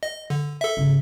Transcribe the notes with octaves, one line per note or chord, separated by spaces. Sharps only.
D#5
D3
A4 E5
G#1 C#3